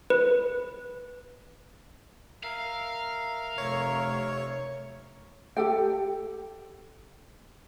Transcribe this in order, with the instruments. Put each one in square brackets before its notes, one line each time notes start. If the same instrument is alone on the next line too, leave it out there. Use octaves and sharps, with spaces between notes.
[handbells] B4
[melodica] A#4 E5 [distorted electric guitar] F5
[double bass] F1 [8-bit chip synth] C#5
[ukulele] G4 A4 G5